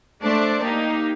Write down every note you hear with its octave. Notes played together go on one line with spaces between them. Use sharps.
A3 D4 C5 D5 A5
A#3 D#4 G4